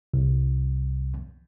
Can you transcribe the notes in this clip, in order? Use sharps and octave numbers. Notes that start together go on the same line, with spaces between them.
C2